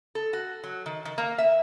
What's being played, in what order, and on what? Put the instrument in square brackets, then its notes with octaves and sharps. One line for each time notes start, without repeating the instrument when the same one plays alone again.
[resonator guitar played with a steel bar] A4
F#4
F#3
D#3
D#3
A#3
E5